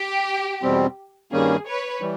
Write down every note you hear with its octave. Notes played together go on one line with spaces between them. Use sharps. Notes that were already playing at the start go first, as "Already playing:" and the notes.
Already playing: G4
E2 B2 G3 C4
G2 D#3 G3 A#3 C#4 G#4
B4 C#5
E3 G3